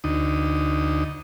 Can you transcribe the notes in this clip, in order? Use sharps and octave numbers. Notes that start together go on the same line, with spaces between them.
D2 D#4